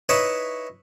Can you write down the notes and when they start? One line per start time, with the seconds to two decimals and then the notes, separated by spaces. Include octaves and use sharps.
0.09 D#4 E4 B4 C#5 E5